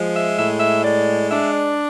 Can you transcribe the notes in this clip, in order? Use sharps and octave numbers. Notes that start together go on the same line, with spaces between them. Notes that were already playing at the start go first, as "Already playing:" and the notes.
Already playing: F3 G#3
E5
A2 E5
E5
G#3 D5
D4 E5
D5